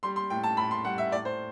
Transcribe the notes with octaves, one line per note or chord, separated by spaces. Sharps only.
G3 C6
C6
A2 G5
A5
A2 B5
C6
G3 F#5
E5
A2 D5
C5